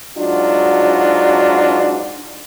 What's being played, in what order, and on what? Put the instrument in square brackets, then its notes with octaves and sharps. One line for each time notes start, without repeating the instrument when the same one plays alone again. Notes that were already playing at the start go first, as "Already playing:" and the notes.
[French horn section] G#2 F#3 D4 D#4 F4 F#4